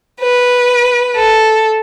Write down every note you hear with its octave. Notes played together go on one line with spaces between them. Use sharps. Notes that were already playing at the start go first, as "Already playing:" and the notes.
B4
A4